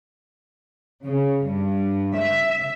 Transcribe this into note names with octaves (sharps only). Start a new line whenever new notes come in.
C#3
G2
E5